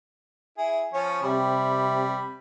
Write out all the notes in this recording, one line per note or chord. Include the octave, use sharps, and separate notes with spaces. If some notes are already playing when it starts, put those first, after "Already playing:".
E4 G#4
F3 C#4 C#5
C3 G3 B5